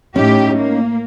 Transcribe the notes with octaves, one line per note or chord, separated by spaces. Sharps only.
A2 C#4 D#4 G4
A#3